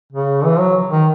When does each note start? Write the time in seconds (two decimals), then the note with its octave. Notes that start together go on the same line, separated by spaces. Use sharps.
0.13 C#3
0.44 E3
0.59 F#3
0.90 D#3